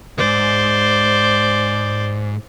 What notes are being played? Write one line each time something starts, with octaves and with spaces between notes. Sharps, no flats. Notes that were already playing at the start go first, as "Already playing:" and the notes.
D2 G#2 C5 D5